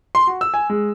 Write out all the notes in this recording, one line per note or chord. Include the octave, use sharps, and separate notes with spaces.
C6
F#4
E6
G#5
G#3